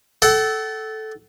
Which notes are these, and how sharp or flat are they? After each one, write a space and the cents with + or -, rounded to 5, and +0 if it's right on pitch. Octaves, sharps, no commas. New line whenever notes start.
A4 -10 F#5 +45